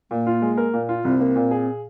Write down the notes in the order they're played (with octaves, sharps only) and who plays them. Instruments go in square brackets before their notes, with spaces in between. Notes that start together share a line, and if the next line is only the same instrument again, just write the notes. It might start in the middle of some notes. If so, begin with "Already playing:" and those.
[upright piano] A#2 [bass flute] A#3
[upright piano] F4
G#3
A#4
A#2
F4
[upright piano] C2 [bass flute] C4
[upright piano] A#3
A#2
G#4